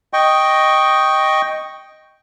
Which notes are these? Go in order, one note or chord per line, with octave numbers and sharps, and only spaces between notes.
D#5 G5 C#6